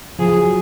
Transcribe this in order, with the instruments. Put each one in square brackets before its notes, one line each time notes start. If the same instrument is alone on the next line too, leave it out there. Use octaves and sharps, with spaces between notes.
[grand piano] F3 [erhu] G#4
[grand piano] F#3